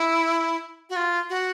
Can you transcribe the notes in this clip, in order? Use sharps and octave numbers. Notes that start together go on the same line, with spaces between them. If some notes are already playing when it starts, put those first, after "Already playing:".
Already playing: E4
F#4
F4
F#4